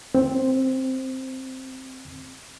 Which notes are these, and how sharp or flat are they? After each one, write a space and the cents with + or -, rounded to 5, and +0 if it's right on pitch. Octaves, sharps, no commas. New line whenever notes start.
C4 +5